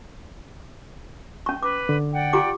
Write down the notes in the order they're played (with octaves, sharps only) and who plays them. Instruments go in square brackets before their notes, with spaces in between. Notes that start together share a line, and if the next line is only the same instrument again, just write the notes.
[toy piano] C#4 C#6
[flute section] B4 [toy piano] D6
[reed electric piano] D3
[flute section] D5 F#5 G5
[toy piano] F4 G4 D6